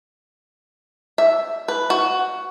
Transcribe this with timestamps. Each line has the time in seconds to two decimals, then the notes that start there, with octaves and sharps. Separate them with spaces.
1.18 E5
1.68 B4
1.90 F#4